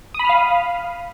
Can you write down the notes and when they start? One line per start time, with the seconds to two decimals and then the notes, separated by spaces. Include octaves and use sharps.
0.14 D#6
0.19 B5
0.24 F6
0.29 F5